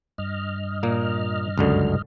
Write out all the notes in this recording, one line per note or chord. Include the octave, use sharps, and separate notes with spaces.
G2 D#5 F6
A#2 A#3
C#2 F#2 D3